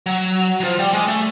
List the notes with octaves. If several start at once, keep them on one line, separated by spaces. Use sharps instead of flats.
F#3
F#3
F3
G3
G#3
A3